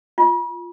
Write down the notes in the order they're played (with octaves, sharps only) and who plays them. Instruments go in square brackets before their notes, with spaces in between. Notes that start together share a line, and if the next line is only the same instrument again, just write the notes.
[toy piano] F4